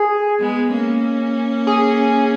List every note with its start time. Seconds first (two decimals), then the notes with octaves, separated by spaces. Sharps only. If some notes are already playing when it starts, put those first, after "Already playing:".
Already playing: G#4
0.40 G#3 B3
0.71 A#3 C#4
1.67 G#4